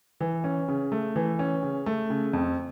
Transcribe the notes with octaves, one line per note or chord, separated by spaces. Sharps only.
E3
C#4
C#3
A3
E3
C#4
C#3
A3
C#3
F2